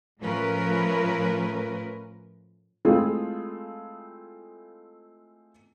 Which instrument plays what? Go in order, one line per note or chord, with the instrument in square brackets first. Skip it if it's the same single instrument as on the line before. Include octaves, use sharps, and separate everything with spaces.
[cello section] A2 F3 A3 C#4 A#4 B4
[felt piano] G#3 A3 C4 E4 F4 G#4